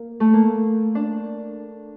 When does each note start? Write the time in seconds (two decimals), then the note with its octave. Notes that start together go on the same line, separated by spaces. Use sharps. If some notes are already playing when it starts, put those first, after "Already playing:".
Already playing: A#3
0.20 A3
0.34 A#3
0.95 D4